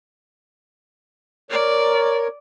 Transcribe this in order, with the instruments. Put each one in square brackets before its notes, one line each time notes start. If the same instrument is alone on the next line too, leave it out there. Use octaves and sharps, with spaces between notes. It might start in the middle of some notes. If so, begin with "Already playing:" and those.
[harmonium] A#4 C#5 [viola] D5